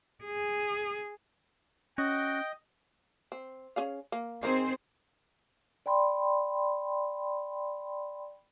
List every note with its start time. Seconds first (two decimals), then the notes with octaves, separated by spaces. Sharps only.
0.24 G#4
1.98 C#4 F#4 D#5 G5
3.32 C4
3.76 C#4 G#4 F5
4.12 A#3
4.43 D#3 C4 D#4 G#4 A#4 C5
5.86 D5 G5 B5 C6